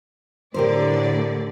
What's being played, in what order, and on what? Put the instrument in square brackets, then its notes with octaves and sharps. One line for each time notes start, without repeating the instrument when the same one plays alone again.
[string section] A2 D3 D5 [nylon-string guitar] G4 A#4 C5